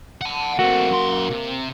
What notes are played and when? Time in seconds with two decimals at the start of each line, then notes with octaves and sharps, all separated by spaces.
0.21 F#5 A5
0.59 A3 A#3 C4 F#4
0.89 F#2 C6
1.31 C3